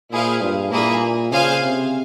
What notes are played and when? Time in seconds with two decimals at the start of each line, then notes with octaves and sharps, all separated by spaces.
0.11 A#2 E4 G#4 C5 F5
0.41 G2
0.71 A#2 A#3 E4 G#4
1.32 C#3 G#4 C5 F5 G#5
1.62 C3